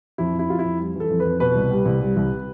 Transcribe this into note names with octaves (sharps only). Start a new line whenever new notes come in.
F2 E4
F2
E4
F2 F4
E4
F2
G3
E3
A4
F2
B4
F2
B2 B4
C2
G3
C2
G3
C2